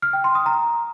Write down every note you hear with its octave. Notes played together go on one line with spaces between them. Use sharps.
F6
G5
C6
D#6
A#5